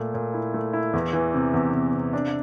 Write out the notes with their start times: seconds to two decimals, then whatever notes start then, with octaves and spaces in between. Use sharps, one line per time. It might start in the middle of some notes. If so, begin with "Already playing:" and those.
Already playing: A#2 A3
0.14 A#2
0.34 E4
0.54 A3
0.73 E4
0.93 E2
1.13 E3
1.34 C3
1.54 E2
1.73 C3
1.93 C3
2.13 D4